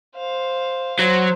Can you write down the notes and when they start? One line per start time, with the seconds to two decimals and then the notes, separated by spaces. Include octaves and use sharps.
0.16 C5 F5
0.99 F#3 C5